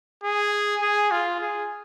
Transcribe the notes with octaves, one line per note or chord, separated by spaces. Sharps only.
G#4
G#4
F4
G#4